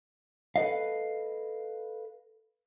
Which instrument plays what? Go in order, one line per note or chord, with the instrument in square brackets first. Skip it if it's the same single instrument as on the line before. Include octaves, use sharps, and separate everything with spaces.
[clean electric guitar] A4 B4 C5 D#5 F5